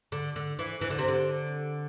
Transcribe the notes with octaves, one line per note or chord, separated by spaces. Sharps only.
D3
D3
E3
E3
D3
C3
D3